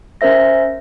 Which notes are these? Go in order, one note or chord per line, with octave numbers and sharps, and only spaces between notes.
C#4 A#4 C5 E5 A#6